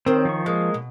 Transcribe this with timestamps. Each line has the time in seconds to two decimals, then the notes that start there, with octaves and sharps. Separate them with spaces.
0.06 D#3 C4 A#4 C5
0.25 F3 C#6
0.46 G#3 A#3
0.74 B2